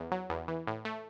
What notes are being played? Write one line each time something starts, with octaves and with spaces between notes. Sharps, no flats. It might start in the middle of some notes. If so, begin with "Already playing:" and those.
Already playing: E2
F#3
E2
E3
A2
A3